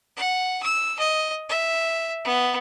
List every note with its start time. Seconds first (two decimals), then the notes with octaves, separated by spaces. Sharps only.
0.17 F#5
0.63 E6
0.99 D#5
1.49 E5
2.25 B3